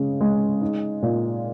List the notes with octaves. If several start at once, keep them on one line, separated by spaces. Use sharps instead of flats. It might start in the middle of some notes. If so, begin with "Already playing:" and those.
Already playing: C#3 G#3
G#3
D#4
A#2